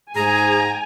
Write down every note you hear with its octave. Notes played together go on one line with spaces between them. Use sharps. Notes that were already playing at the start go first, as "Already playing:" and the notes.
G#2 G#4 G#5 A#5